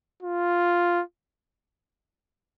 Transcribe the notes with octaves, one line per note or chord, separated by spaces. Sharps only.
F4